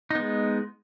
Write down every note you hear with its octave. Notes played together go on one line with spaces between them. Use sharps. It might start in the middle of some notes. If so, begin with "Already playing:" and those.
G#3 B3 D#4